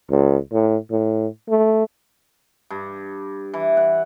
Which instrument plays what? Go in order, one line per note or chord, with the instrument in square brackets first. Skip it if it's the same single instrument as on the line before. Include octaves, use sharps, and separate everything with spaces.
[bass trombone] C#2
A2
A2
A3
[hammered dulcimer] G2
E3
F#5